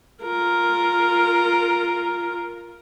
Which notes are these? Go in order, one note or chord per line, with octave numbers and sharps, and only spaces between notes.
F4 A#4